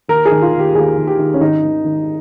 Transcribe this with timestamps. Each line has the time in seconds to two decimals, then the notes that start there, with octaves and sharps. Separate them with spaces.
0.08 D#2 A#4
0.25 G#4
0.31 D#3
0.42 F4
0.53 D#2
0.59 G4
0.75 D#2 G#4
0.97 D#2
1.07 G4
1.19 D#3
1.34 C#4
1.41 G#1 D#4
1.63 D#3
1.85 D#3